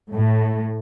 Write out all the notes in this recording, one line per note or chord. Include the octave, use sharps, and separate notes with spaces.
A2